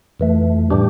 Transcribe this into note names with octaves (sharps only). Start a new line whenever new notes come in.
F2 E3 A3
A2 E3 G3 D4 G4